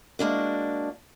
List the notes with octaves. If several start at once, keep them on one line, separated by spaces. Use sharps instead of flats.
G#3 A#3 D4 F#4